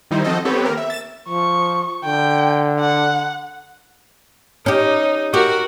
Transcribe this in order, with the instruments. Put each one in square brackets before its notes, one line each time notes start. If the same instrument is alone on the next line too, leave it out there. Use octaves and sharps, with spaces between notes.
[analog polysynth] D#3 G3 D#4 E4 C5
F3 C4 F#4 A4 D#5
B3 C4 G4 A4 B4 C#5
D#3 A#3 A#4
E5
A6 E7
[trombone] F3 [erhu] C#6
[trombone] D3 [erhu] G5
[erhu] F#5
[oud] C#4 G4 [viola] D#4
[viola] F#4 A#4 [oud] G4